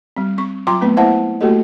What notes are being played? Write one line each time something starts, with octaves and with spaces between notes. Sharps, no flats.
G3 C4
C4 C#6
F#3 F4 G5 A#5 C6 D6
A3 B3 C4 B4
A#3 E4 C5 E5 F#5 A5
A3 A#3 F#4 G4 A4 D#5